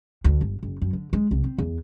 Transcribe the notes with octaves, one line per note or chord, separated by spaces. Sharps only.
D2
G1
F#1
F#2
D3
G#3
C2
C4
E2